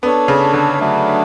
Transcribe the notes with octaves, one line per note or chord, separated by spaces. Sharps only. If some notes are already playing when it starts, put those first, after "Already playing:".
B3 D4 A4 C#5
C#3
D3
F#3 A3 D4